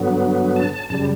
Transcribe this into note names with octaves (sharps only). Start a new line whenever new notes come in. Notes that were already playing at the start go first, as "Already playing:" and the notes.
Already playing: G2 D3 F#3 B3
A5
A5
F#2 C#3 G3 A5